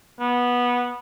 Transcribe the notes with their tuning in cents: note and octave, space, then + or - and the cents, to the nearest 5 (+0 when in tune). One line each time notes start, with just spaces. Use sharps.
B3 -15